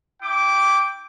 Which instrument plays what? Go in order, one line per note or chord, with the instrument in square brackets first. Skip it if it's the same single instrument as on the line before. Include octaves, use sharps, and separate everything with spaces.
[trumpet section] E4 G5 D6